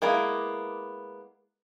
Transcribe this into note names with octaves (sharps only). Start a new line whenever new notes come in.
G#3 A#3 B3 E4